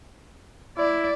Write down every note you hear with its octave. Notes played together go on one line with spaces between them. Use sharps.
E4 D5